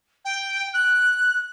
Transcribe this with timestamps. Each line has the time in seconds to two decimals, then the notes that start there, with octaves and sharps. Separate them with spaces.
0.25 G5
0.73 F#6